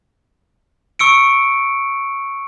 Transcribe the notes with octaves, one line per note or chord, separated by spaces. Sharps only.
C#6 E6 C#7 D7